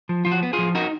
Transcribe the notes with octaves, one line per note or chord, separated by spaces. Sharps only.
F3
F3 F4
F#4
B3
F4 G#4
F3
D#4 F#4 A#4